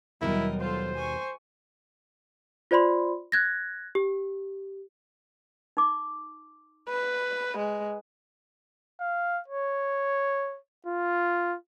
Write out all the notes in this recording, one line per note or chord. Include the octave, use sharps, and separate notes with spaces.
D#2 B2 F#3 G3 E4 A#4 D#5
F4 A4 C5
G#5 C#6
F4 C5 D5 B5 C6
F#6 G#6 A#6
G4
D#4 D6
B4
G#3
F5
C#5
F4